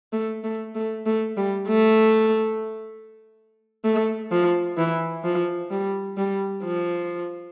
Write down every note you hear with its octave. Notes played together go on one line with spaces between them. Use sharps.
A3
A3
A3
A3
G3
A3
A3
F3
E3
F3
G3
G3
F3